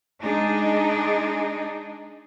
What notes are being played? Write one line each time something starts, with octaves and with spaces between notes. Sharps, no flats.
G#3 D4 D#4 G#4